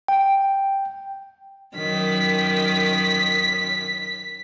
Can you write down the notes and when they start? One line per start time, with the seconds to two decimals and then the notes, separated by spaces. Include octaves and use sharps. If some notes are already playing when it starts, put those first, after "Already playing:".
0.08 G5
1.77 F#2 D#3 B6